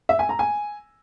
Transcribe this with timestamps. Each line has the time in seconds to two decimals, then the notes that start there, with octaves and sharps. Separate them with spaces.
0.09 E5
0.19 G#5
0.29 A#5
0.39 G#5